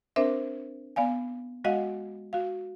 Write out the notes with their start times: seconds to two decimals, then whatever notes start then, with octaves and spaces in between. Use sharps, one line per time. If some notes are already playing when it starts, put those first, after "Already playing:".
0.16 C4 D4 A#4 C5 E5
0.96 B3 D5 F5 G#5
1.64 G#3 F#4 D#5 F5 F#5
2.33 F#4 F5